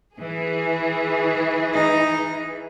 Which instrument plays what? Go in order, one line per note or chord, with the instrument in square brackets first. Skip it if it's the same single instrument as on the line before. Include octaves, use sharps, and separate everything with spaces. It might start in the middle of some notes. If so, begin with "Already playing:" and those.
[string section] E3 G#4
[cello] D#4